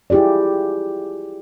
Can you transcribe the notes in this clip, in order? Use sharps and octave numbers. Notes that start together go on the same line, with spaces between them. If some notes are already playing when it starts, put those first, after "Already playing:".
E4 F4 G4 G#4 D5